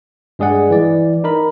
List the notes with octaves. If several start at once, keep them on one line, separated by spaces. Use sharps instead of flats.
G2 G#3 G#4 D5 F#5
E3 D5
D#4 A#4 B5